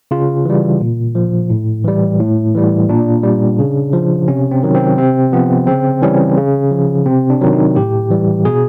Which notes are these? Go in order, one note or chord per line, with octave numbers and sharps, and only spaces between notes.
C#3 F4
E3 G3
A#2
F3
A2
E3 G3
A2
E3 G3
A#2 D4
G3
C#3
F3
C3 C#4
C4
D#3 F#3
C4
C3 C4
F3 B3
C#3 C4
E3 G3 C#4
C#3
F3
C3 C4
D4
D#3 F#3
D#4
A2 G4
E3 G3
B2 G#4